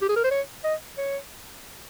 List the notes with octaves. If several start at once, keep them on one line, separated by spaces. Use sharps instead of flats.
G4
G#4
A#4
C5
C#5
D#5
C#5